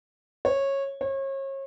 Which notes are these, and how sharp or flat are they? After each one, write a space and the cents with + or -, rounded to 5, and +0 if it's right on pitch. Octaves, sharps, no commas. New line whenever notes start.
C#5 -15
C#5 -35